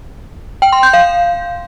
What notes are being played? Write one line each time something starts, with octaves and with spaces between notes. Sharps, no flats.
G5
C6
G6
F5